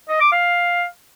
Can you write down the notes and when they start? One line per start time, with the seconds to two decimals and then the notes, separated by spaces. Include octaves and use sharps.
0.09 D#5
0.21 D6
0.32 F5